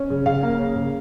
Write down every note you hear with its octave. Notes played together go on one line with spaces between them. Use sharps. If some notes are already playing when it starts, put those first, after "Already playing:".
Already playing: C#4
C#3
C#3 F5
A#3
C#4
C#3